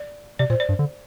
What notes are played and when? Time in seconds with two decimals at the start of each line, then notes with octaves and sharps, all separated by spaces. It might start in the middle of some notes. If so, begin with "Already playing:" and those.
Already playing: D5
0.39 C3 D5
0.50 A#2 C5
0.60 D5
0.69 G2
0.79 D3